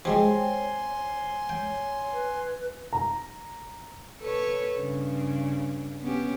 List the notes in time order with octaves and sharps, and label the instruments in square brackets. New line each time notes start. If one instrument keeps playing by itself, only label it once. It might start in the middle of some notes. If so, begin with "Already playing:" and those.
[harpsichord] F3 G3 G#3 [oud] C4 [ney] C#5 [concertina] G#5 C6
[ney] C#5 [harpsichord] G5
[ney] B4
[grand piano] A#5
[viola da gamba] A4 B4 C#5
G2 C#3
B3 C#4 G4